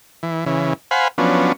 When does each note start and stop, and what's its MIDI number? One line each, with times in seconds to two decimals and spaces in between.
0.23 0.45 52
0.46 0.73 49
0.46 0.73 52
0.91 1.08 72
0.91 1.08 77
0.91 1.08 78
0.91 1.08 80
0.91 1.08 83
1.18 1.52 53
1.18 1.52 54
1.18 1.52 59
1.18 1.52 61
1.18 1.52 62